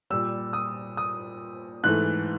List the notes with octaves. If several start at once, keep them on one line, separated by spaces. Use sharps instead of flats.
A#2 G3 E6
D#6
D#6
G#2 E3 A3 F#6